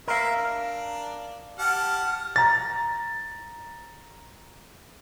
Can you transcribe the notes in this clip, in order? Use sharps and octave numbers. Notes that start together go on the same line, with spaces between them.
A#4 E5 F5
D4
G4 F#5 A5 F6
A#5 A6